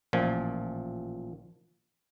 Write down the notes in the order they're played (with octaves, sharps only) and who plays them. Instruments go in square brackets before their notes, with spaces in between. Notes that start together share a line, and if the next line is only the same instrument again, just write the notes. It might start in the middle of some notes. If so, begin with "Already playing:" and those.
[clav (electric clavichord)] A1 A#2 F3